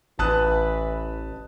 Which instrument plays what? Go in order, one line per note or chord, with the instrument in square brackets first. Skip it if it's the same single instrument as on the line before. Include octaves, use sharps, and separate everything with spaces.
[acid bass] A1 [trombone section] E3 B4 [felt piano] A5 D#6 F#6